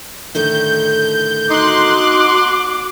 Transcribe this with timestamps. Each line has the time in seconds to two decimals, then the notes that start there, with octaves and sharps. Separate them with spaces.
0.35 A2 D3 D#3 G6
1.50 D#4 F#4 C6 D6 F#6